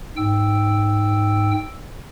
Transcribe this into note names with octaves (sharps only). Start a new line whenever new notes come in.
G#2 G5 E6